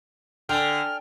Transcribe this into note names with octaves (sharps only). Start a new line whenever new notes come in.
D3 G5 G#5 F6